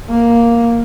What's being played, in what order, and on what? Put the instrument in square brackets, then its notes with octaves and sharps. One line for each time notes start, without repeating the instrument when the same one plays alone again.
[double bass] A#3